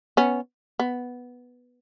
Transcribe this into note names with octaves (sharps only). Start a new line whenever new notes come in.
B3 C#4
B3